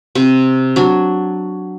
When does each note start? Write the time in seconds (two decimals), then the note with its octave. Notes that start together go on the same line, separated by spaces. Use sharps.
0.15 C3
0.76 F#3 D4